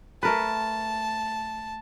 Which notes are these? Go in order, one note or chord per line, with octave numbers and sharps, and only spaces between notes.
A3 A#4 B4 A5